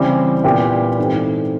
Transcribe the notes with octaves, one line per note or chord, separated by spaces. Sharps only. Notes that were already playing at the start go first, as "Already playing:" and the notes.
Already playing: C#3 E3 G3 C4
A#2 G3 B3 E4 G4
G#2 E3 A3 C4